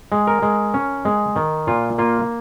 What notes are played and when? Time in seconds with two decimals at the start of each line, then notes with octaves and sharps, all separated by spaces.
0.12 G#3
0.27 A#4
0.42 G#3
0.74 C#4
1.05 G#3
1.36 D#3
1.67 A#2 F4
1.98 A#3 F4